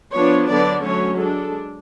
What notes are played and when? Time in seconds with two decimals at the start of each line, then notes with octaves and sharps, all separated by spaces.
0.15 F3 B3 D4 C#5
0.50 D3 F#3 B3 D4 D5
0.84 F#3 A3 C#4 C#5
1.19 G#3 D4 A4